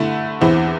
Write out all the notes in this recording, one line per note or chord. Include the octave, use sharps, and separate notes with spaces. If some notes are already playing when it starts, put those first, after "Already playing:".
Already playing: D3 A3 E4
E2 E3 C4 E4